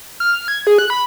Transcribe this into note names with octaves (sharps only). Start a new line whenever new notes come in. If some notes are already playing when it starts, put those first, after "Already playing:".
F6
F6
G#6
G#4
F#6
B5